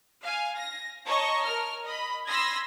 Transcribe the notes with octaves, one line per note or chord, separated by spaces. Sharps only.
F5 G#5
A#6
C#5 D#5 A5 A#5 C#6
A#4 F6
D#5 B5
B5 C6 D#6 E6 G#6 A#6